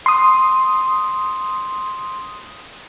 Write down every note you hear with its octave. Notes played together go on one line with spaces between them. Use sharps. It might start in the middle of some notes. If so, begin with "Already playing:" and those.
C6 D#6